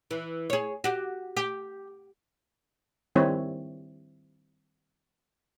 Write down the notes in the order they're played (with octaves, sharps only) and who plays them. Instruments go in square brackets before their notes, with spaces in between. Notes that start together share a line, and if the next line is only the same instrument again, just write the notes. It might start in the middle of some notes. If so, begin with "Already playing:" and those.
[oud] E3
G#4 C#5
F#4 G4
G4
[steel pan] D#3 G3 C4 E4 C#5